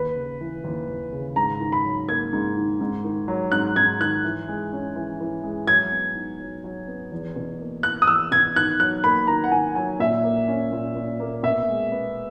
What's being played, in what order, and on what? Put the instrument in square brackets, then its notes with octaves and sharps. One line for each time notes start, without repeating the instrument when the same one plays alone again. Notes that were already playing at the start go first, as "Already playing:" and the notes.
Already playing: [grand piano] D#2 [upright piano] B4
[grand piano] C#3
E3
D#2
D#2
C#3
[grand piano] G#2 [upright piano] A#5
[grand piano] D#3
[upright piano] B5
[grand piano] F#3
[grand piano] A#3 [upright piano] G#6
[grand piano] G#2
D#3
G#2
D#3
F#3
[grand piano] G#2 [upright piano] F#6
[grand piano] G#2 [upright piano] G#6
[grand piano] D#3 [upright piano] F#6
[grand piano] E3
G#3
C#4
E3
E3
G#3
[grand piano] F#3 [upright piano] G#6
[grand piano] B3
D#4
F#3
F#3
B3
E2
B2
A#3
[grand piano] E4 [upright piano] F#6
[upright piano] D#6
[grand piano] E2 [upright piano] E6
[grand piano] B2 [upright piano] G#6
[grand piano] D#3 [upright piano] F#6
[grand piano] F#3 [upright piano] F#6
[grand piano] A#3 [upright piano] B5
[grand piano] D#3 [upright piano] A#5
[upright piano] F#5
[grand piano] D#3 [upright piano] G#5
[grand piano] F#3 [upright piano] G#5
[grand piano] A#2 [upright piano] E5
[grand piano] A#3
C#4
A#2
A#2
A#3
[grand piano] B2 [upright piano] E5
[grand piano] G#3
B3